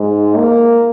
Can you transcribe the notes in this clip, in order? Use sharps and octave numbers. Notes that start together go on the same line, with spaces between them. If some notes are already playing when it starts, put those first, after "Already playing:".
Already playing: G#2
A#3